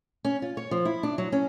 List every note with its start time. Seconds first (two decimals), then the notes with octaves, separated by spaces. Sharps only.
0.25 C#4
0.42 F4
0.57 C#5
0.71 F3
0.85 E4
1.03 D4
1.18 F#3
1.32 C#4